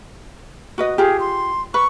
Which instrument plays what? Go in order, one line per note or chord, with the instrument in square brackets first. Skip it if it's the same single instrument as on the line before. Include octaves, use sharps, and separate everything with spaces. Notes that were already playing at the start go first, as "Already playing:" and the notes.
[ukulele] F#4 B4 D#5
[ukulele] F4 G4 [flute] G#4
[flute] C6
[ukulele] B4 [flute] C#6